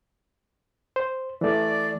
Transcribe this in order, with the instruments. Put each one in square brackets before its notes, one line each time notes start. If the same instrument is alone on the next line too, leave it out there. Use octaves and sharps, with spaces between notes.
[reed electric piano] C5
[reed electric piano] E3 A3 [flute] D5